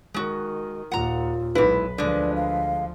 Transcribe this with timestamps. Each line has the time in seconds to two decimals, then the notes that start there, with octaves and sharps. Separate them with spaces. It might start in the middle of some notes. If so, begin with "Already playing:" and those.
0.14 D#3 G#3 F#4
0.92 D#2 A#2 F4 F#5 A#5
1.55 B1 G#2 E4 B4
1.98 D2 D3 F3 G#3 D5
2.36 F5